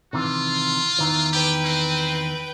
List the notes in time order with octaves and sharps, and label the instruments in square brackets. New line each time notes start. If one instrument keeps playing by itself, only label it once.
[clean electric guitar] C3 D#3 E3 [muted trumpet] F4
[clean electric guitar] E2 D#3 E3
[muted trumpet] G4 [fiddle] B4 G5
[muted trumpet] C4